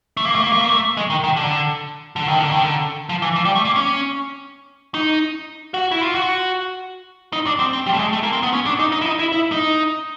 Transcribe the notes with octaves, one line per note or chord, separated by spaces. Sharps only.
A3
A#3
A3
A#3
A3
A#3
A3
G#3
D#3
D#3
D3
D3
D#3
D3
D#3
D3
F3
E3
F3
G3
A3
A#3
C#4
D#4
F#4
E4
F4
F#4
D#4
D4
C4
C4
G3
A3
G#3
A3
A#3
C4
B3
C#4
D4
D#4
D#4
E4
D#4
E4
E4
D#4